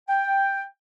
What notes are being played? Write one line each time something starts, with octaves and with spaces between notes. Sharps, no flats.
G5